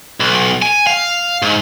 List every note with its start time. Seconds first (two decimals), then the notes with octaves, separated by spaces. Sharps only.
0.20 B1
0.62 G#5
0.87 F5
1.42 G#2